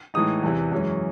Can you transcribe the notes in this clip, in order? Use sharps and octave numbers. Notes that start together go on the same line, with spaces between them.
A2 E3 G#3 D#4 D#6
E2 C3 E3
F#2 E3 G#3 C#4